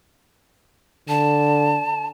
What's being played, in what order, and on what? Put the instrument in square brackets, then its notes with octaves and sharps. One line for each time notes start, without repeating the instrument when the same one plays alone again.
[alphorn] D3 [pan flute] A5